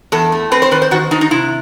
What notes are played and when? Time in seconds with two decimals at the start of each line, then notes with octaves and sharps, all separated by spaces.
0.12 E2 A4
0.32 A3
0.52 C4 B4
0.62 C5
0.71 D#3 B4
0.82 C5
0.91 D#3 F#4
1.11 D#3 D#4
1.21 D#4
1.31 C3 E4